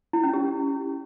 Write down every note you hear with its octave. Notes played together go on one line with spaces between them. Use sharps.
E4
C#4
G4